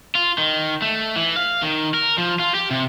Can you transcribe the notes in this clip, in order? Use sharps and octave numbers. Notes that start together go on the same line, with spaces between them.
F4
D#3
A3
E3
F5
D#3
A#4
F3
F4
G4
C3